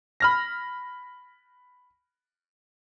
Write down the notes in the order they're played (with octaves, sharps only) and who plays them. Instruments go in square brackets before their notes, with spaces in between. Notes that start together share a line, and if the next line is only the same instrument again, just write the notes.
[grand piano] B5 F6 A#6